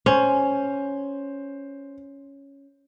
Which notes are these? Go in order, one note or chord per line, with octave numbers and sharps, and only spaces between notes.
C#4 C5